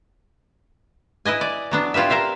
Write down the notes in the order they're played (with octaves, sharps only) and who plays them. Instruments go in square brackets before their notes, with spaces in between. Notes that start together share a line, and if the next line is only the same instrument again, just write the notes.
[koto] E4 B4 D#5 G#5
D5
F#3 B3 D4
E4 F4 G4 B4 E5
A#4 C5 E5 F5